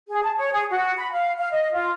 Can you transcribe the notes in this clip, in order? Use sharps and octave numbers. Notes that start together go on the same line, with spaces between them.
G#4
A5
C#5
G#4
F#4
B5
F5
F5
D#5
F4